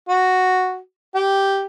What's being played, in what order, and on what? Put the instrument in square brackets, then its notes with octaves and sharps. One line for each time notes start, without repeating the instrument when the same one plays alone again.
[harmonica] F#4
G4